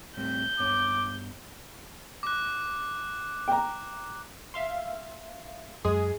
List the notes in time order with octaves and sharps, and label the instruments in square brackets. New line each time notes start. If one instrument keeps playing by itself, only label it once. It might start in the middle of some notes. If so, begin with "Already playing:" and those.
[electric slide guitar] A2 G3 C4 [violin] G6
[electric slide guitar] G2 B3 C#5 [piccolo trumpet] D6
[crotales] D6 F#6
[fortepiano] G5 A#5
[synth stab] E5 F5 C6
[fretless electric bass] F#2 [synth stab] G#3 G#4